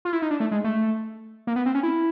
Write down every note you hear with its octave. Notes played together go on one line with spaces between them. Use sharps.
F4
E4
D#4
D4
A3
G#3
A3
A#3
B3
C4
C#4
E4